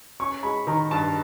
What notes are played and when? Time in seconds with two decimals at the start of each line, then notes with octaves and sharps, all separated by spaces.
0.20 C#4 C#6
0.43 G#3 B5
0.67 D#3 A#5
0.91 G2 A5